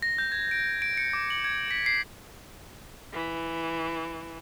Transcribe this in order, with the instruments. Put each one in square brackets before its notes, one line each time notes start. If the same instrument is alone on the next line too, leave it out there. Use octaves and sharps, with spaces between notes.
[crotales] A#6
G6
G#6
D7
D7
C#7
D6
F#7
G#6
B6
C7
[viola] E3